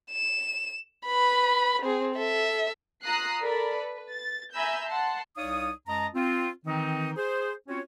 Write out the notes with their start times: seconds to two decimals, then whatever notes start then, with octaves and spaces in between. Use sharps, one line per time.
0.11 E7
1.05 B4 B5
1.82 C4 G#4
2.15 A4 E5
3.03 F4 A#5 D#6 F#6 C7
3.42 A4 A#4 D5 B5
3.77 B4
4.13 A6
4.54 E5 G#5 A#5 B5 E6 G6
4.86 F#5 A5 C6
5.36 C2 D#4 C#5 D5 F5 D#6
5.87 F#2 G#3 D#5 A5 A#5
6.14 C4 F4
6.65 D#3 E3 C4 D#4
7.16 G#4 C5
7.68 C4 C#4 F4 F#4 C#5